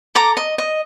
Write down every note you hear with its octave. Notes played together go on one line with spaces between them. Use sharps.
A4 A#5 D6
D#5
D#5